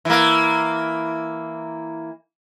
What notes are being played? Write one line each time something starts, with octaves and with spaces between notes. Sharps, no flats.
E3 A#3